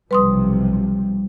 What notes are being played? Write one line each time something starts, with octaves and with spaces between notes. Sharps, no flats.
B1 C3 F3 G3 B4 C6 D#6